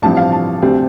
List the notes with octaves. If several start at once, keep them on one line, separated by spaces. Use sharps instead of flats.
A1 G2 F3 C4 A5
F5
A5
D2 C3 G3 C4